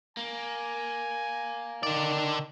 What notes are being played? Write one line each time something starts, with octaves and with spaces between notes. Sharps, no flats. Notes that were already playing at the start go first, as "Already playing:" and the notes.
A#3 G#5
D3 D#3 D5